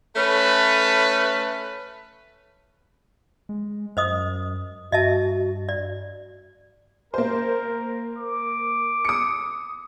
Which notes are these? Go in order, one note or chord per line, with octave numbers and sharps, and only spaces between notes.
A3 C#4 A4 B4
G#3
F#2 C5 D#5 D#6
G2 F#4 D#5 E5 A5
D5
A#3 A#4 C5
D6
D#6 C#7